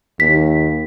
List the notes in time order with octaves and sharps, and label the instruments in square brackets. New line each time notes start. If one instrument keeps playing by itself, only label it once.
[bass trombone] D#2 [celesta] B6